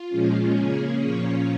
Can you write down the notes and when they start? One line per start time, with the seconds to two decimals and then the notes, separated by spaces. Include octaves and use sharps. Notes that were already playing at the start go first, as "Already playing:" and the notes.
Already playing: F4
0.09 A#2 F3 G#3 C#4
0.55 C#3 A#3 C#4 G#4
1.01 A#2 F3 A#3 C#4 C#5